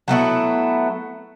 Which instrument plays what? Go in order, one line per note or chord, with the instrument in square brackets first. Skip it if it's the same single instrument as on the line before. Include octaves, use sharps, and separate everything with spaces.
[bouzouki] F#3 A3 B3 E4